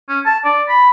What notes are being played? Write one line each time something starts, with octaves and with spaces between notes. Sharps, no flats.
C#4
A5
D5
B5